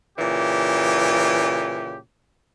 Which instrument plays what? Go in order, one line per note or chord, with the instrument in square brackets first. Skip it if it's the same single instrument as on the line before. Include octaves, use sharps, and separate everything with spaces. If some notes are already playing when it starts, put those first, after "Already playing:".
[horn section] A#2 C#3 E3 G4